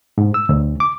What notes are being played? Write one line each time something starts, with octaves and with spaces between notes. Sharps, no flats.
G#2
E6
D2
D6